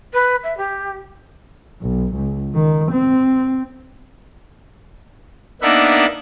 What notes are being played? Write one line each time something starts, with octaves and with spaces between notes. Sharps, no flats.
B4
E5
G4
B1
C#2
D#3
C4
A#3 B3 D4 D#4 E5 F#5